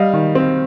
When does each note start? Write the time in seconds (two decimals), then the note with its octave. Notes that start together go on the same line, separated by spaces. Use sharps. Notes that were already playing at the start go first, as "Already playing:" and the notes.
Already playing: G3 D#5 F5
0.13 D#3
0.35 C4